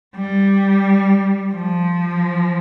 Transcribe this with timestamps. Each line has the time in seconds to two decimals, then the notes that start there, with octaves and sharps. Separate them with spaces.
0.15 G3
1.52 F3